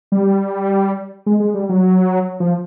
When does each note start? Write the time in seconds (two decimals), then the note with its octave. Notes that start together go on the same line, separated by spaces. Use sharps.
0.12 G3
1.26 G#3
1.40 G#3
1.54 G3
1.69 F#3
2.40 F3